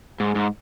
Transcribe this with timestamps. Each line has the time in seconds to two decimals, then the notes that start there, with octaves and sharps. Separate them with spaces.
0.20 G#2
0.35 G#2